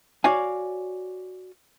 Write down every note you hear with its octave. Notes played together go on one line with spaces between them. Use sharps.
F#4 C#5 D5 F5 G#5